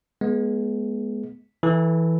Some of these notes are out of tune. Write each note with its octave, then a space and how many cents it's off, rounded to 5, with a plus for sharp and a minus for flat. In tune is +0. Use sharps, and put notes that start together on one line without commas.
G#3 +20 B3 -20
E3 +0 A4 +0